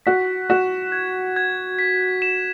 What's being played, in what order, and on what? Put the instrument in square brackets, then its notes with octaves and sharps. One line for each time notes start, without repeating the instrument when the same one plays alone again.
[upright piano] F#4 [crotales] B6
[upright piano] F#4 [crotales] E7
[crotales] G#6
G#6
B6
E7